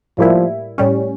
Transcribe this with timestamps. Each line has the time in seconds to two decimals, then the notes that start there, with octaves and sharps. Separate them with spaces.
0.18 A2 F3 G3 A#3 E4
0.78 A2 G3 C#4